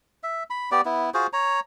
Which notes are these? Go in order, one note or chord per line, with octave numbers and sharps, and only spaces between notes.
E5
B5
B3 G4 D5
B3 E4
F4 F#4 G#4 C5
C#5 A#5